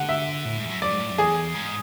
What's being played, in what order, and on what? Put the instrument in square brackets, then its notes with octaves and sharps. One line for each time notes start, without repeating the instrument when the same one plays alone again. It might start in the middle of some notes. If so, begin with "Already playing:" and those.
Already playing: [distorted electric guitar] D3 [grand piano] F#5
[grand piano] E5
[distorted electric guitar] A2
G#2
E2
F#2
[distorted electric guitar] F#2 [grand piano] D5
[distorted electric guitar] G#2
A2
F#2
[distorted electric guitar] E2 [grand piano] G#4
[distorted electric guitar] G#2